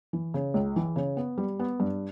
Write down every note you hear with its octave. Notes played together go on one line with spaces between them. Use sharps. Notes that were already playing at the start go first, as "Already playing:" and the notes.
E3
C#3
C#2
E3
C#3
B3
G3
B3
G2